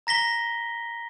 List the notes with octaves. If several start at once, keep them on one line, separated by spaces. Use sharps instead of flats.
A#5 A#6 B6 G7